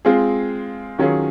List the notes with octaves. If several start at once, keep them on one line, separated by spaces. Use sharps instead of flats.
G#3 C4 F4 G#4
D#3 F#3 C#4 F4 G#4